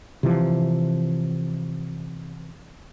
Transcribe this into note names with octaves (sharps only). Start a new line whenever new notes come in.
C3 E3 F3